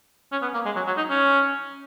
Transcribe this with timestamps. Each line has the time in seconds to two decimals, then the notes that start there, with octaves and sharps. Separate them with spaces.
0.32 C#4
0.42 B3
0.54 A#3
0.65 G#3
0.76 F#3
0.87 F#3
0.97 D#4
1.09 C#4